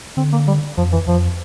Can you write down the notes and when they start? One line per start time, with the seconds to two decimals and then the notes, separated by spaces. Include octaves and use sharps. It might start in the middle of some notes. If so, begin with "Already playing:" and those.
0.17 D3 C4
0.32 A#3
0.47 G3
0.78 F2 F3
0.93 E3
1.07 F2 F3